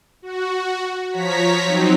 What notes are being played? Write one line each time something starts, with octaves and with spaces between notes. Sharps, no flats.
F#4
F3 C#5 A#5 B6
F#3 C4 D#4